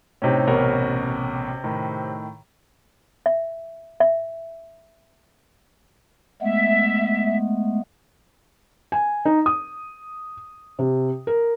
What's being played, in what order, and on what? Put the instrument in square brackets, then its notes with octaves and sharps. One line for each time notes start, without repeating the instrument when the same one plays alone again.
[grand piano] A2 D#4 G4 [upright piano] C3 C#4
[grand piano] A1 B2 A#4
A2 D#3
[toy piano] E5
E5
[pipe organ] G#3 A3 B3 [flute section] E5
[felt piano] G#5
D#4
D#6
C3
A#4